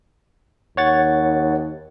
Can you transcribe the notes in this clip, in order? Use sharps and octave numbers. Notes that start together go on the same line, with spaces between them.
D#2 C#5 F#5 A6